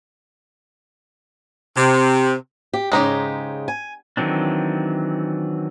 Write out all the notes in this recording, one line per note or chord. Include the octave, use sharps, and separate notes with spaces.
C3
G4
G#2 C#3 G#3 D#4 G4
G#5
D#3 E3 F#3 C4 D4